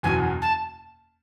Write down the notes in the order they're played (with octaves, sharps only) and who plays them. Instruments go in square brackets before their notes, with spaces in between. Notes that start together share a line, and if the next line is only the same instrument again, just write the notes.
[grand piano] F#1 E2 B2 F#3 [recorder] G#5
[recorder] A5